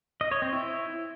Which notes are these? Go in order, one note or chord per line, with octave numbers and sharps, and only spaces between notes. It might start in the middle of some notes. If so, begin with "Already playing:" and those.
D#5
C#5
C4
E4